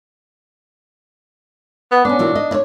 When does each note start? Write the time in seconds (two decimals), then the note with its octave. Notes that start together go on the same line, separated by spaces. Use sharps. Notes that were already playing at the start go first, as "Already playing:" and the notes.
1.91 B3
2.05 B3 C#4 D4
2.19 A#2 E3 F#3
2.35 D#5
2.51 E4 C#5